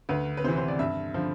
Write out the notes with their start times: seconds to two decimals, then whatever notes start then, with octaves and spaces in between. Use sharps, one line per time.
0.09 D2 B4
0.37 B4
0.44 C3 C5
0.48 E3
0.57 C5
0.68 D5
0.79 G2 E5
1.14 D3 F3